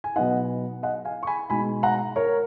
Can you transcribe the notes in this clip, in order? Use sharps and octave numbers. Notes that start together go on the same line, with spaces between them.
G#5
B2 F#3 B3 D#4 D#5 F#5
D#5 F#5
F5 G#5
C#6
G#5 B5
B2 G#3 D#4 G#5 B5
F#5 A#5
A#4 C#5